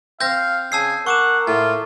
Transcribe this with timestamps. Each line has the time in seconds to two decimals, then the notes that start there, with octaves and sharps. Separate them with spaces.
0.21 C4 F5 G6 A#6
0.72 C#3 G#4 A5 E6 C7
1.06 A#4 F#5 C#6 D6 E7
1.48 A2 F4